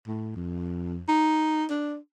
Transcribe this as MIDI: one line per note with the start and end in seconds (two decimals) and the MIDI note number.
0.08 0.35 45
0.36 1.01 41
1.08 1.65 63
1.70 1.97 62